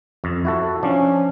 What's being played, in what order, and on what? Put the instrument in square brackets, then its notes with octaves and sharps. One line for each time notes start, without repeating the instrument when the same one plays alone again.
[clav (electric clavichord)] F2
E4 F#4 A4
[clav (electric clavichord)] F3 D4 [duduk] C#4